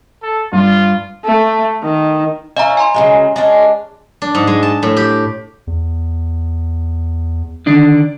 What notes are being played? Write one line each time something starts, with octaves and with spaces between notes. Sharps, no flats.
A4
G2 F4
A3
D#3
C#4 E4 D#5 F5 A#5
G#5 A#5 C6
C#3 F#3 G#3
G#3 C#4 D4
D4
G#2
G#3
A5
A2
G4
E2
D3 D#3 D4